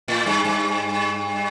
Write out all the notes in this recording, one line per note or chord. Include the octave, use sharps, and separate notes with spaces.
A2
G2
G2